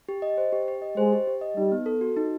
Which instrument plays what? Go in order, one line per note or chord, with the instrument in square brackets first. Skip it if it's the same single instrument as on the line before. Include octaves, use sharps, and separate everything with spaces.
[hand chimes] G4
D#5
C5
G4
G4
D#5
[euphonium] G#3 [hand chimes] C5
[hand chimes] G4
G4
D#5
[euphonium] G3 [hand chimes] D#4
[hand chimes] B3
A4
F#4
D#4